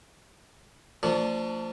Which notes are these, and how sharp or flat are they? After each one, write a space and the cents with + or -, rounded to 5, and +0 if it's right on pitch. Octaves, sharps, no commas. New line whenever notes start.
F3 +0 A3 +45 D4 +0